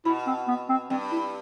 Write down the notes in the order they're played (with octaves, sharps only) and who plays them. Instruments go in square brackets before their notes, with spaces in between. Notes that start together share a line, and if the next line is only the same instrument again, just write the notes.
[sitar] B2 [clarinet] E4
[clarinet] C4
B3
C4
[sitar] G2 [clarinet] C4
[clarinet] E4